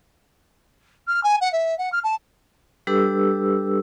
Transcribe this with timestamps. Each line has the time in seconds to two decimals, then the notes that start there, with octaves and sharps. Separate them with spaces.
1.08 F6
1.23 G#5
1.41 F#5
1.52 E5
1.78 F#5
1.92 F6
2.04 A5
2.87 G3 D4 G4 A4 B4 E6